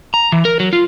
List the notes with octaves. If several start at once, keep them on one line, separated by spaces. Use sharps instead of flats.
A#5
E3
A#4
F#3
F4